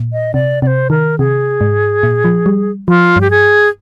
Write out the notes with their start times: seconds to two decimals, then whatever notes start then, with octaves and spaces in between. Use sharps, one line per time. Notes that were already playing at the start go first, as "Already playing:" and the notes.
Already playing: A#2
0.13 D#5
0.34 C3 D5
0.62 C3 C5 D5
0.90 D#3 A#4
1.19 C3 G#4
1.61 G#2
2.03 A#2
2.25 F3
2.46 G3
2.88 F3 F4
3.16 G2 G4
3.30 G#4